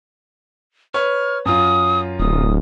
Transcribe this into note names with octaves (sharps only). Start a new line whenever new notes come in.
B4 C#5 F6
F#2 F4 D#6
D1 D#6